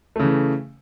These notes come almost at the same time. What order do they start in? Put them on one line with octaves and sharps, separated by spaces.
A3 C#3 E3